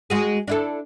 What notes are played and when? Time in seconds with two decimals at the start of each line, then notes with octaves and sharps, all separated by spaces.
0.10 G#3 F#4 G#4
0.48 D4 E4 A4